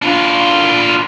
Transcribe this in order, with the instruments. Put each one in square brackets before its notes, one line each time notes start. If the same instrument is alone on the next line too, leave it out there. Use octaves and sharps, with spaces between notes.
[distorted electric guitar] D4 F4